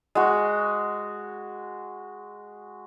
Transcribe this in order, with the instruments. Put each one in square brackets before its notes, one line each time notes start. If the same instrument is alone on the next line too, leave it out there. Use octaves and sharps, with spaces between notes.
[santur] G#3 F#4